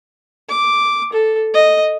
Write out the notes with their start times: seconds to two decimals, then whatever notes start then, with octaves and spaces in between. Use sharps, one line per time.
0.49 D6
1.13 A4
1.54 D#5